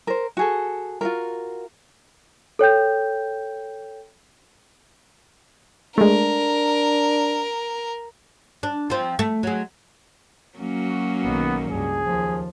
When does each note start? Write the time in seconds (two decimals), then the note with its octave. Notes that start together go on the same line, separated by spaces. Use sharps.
0.07 A#4 C5
0.37 F#4 G#4 A4
1.01 F4 F#4 A#4
2.59 A4 C#5 G5 G6
5.98 G#3 A3 D4 A#4
8.63 D4
8.90 F3 C4
9.19 A3
9.43 F#3 G#3
10.58 F#3 A#3 C#4
10.88 F#4
11.23 B1 D#3 B3
11.70 C#2 G2 G#4
12.05 D#2 F3